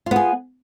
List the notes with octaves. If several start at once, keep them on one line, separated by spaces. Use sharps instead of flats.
B3 F4 G#4